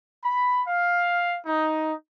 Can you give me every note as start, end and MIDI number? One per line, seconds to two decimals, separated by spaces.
0.24 0.62 83
0.68 1.38 77
1.46 1.92 63